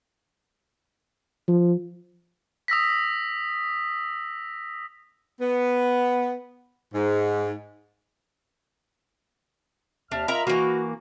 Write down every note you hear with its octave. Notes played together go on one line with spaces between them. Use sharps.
F3
D#6 E6 A#6 B6
B3
G#2
D#2 D4 E5 F6
F4 A#4 D#5 E5 A#5 B5
E3 A#3 F#4